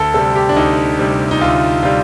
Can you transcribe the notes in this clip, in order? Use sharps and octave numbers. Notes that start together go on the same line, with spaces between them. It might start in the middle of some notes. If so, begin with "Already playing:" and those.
Already playing: D2 A4
C3 G3 A4
G4
D4
D2 D#4
C3 G3
D#4
D2 F4
C3 G3 F4